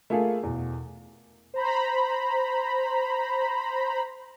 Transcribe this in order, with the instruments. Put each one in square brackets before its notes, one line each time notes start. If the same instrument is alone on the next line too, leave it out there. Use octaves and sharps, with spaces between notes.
[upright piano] A3 A#3 F4 G#4 A4
E2 B2
[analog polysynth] C5 A#5 B5